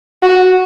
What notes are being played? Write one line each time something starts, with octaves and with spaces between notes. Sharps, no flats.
F#4